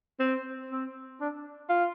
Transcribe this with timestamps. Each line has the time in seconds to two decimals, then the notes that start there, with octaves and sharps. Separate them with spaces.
0.19 C4
0.70 C4
1.20 D4
1.69 F4